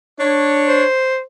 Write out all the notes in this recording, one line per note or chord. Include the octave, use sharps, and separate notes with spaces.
D4 C#5
C5